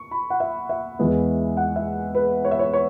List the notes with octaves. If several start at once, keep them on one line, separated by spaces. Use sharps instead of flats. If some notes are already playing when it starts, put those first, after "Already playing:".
Already playing: C#6
B5
F#5
E5
E5
E2 E3 G#3 B3
F#5
E5
B4
C#5
E5
C#5
C#5